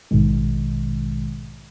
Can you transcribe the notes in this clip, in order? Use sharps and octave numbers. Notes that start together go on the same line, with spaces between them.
A#1 G#2 B2 D#3 G#3